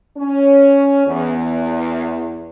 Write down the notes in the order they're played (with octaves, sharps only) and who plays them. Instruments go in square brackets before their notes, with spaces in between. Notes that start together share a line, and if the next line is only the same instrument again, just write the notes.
[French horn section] C#4
E2